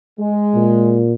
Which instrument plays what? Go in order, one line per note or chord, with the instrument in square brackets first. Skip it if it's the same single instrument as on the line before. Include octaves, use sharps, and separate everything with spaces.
[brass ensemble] G#3
[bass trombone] A#2